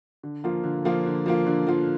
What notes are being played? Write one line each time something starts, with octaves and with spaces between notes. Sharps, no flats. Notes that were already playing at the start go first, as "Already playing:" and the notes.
D3
F3 A#3 F4
D3
F3 A#3 F4
D3
F3 A#3 F4
D3
F3 A#3 F4